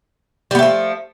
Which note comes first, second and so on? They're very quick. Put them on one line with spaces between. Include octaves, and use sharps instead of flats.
G3 B3 A3 F3